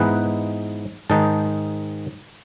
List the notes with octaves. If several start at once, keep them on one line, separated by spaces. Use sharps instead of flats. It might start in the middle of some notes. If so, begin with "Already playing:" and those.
Already playing: G#2 E3 B3 D#4 B4
G#2 D#3 G#3 D#4 A5